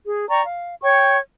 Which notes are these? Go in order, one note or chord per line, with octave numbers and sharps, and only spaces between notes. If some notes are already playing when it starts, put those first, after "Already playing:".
G#4
D5 G5 A#5 C#6
F5
C#5 G5 C#6